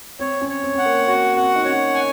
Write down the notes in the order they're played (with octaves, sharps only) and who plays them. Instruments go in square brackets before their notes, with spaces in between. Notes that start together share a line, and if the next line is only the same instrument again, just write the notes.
[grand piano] C4 [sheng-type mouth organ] C#5
[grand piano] C#4
[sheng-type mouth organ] C#5
[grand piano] C4
[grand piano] C4 [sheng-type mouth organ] F#5
[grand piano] A#3
[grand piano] C4 [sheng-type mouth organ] F#4
[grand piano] C4 [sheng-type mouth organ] F#5
[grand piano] D#4
[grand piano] C#4 [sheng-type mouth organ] C#5
[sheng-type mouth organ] G#5